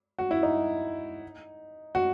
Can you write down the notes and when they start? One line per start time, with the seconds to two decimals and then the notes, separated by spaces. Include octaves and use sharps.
0.19 F#4
0.31 E4
0.43 D#4
1.95 F#4